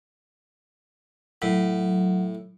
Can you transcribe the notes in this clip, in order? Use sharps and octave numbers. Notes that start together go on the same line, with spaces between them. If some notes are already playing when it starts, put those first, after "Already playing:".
A2 F#3